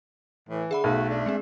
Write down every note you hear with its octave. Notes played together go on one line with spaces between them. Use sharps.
A2 E3
D3 G#4 E5 B5
B1 A3 F#4
D4
G#3 C4 G#4